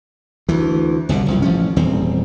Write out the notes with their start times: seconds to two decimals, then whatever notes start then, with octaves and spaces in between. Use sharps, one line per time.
0.48 D2 E3
1.09 G1 C2 B2
1.26 F#1 C2 F3
1.42 A1 F3 C#4
1.76 D#1 E2 C4